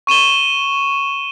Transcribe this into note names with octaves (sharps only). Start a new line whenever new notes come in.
C#6 D#7 E7 G7